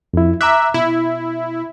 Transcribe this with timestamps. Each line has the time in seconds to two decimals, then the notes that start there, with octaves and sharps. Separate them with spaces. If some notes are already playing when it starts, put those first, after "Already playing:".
0.14 F2 E4
0.41 E5 A#5 D6 F#6
0.74 B2 E4